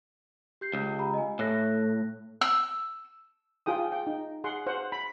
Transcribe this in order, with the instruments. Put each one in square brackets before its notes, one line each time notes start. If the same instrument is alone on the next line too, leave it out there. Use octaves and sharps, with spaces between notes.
[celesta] G4 G6 C7
[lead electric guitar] C#2
[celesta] G4 A#5 B5
D#5 G#5
[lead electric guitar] A2 [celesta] A4 F#6 A#6
[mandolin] E6
[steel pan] F4 G#4 G5 D#6
G5
D#4
G#4 F#5 C6
C5 F#5
B5